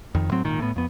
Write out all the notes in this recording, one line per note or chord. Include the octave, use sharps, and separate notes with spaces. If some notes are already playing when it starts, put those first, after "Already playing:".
F2 D#3
A2 F#3 C4
G#1 A#2 D#3
A2 B3
F2 B3